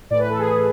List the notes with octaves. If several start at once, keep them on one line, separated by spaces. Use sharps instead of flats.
A2 E3 D5
B4
A4
G#4